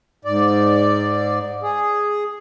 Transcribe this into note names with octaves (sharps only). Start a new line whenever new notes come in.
G#2 D5
G#4